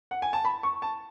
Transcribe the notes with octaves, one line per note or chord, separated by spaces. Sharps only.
F#5
G#5
A5
B5
C#6
A5